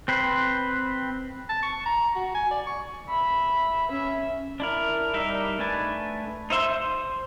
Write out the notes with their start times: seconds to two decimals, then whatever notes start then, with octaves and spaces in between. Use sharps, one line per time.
0.08 C4 B4 C5
1.49 A5
1.63 C#6
1.86 A#5
2.16 F#4
2.35 G#5
2.51 D5
2.66 C#6
3.10 E5 B5
3.91 C#4 E5
4.60 D4 E4 A#4
5.14 G3 D#4 A#4 E5
5.59 A3 D4 B4 G#5 A5
6.50 D#4 C5 E5 C6
6.70 C5